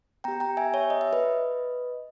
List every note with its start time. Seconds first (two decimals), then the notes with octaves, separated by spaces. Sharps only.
0.24 B3 G4 G5 A#5
0.40 G5 A#5
0.57 E5 G#5
0.74 C#5 E5
0.90 D#5
1.01 E5
1.13 B4 D#5